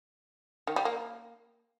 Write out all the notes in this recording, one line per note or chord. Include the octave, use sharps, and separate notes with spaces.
D#3
G3
A#3